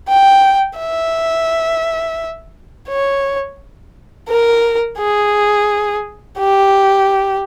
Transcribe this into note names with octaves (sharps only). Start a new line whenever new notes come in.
G5
E5
C#5
A#4
G#4
G4